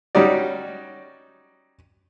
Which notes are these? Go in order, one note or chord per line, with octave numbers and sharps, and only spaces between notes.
G3 C#4 D#4 F#4 D5